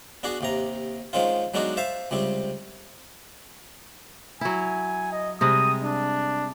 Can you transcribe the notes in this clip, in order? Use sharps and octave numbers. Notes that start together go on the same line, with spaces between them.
B3 D4 F#4 G#4
D#2 C3 A#5
D#3 F3 G#3 C4 C#4 F4
F#3 G#3 B3 D4 D#4 F#4
C5 E5 F5 A5
C#2 C3 G3 C4
F#3 E4 G#5
D#5
C3 G3 G#3 D#6
D4